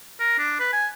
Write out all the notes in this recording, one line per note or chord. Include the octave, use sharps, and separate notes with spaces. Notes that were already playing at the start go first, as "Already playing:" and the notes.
A#4
D4
B4
G#5